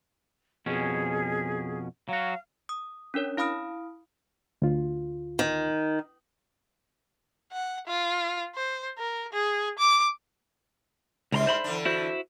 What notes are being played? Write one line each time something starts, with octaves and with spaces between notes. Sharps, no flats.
F2 B2 C#4 G#4
F#3 F#4 F5
D#6
C#4 D4 A#4 C#5
E4 F5 B5 D#6 F6 D7
D2 F4
D#3
F#5
F4
C5
A#4
G#4
D6
C#2 G#2 G3 D4 A#5 C6
C5 B5 C6
E2 D3 D4
E4 F#4 C5